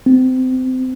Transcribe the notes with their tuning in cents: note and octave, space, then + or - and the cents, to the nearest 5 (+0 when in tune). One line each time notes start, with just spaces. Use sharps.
C4 -25